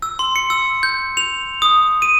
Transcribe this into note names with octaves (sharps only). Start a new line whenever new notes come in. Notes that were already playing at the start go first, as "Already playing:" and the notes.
E6
C6
C#7
E6
G6
F7
D#6
D#7